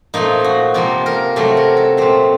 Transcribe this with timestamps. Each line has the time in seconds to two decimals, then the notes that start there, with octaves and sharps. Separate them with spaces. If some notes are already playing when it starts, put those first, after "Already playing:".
0.14 A#2 F3 A3 D#4
0.44 F#4
0.74 C3 F3 A#3 A4
1.06 A#4
1.36 C3 F#3 A3 A4
1.57 A#4
1.77 A4
1.97 A#2 A3 C4